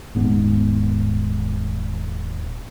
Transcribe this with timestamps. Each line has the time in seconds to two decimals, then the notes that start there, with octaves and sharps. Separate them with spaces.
0.15 D#1 G#2 B3